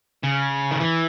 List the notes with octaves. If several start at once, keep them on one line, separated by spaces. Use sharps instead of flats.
C#3
D#3
E3